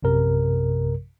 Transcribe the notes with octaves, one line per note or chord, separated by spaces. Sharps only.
A#1 F#2 C3 A#4